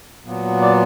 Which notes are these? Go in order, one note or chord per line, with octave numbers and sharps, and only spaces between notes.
A#2 F#3 B3
D5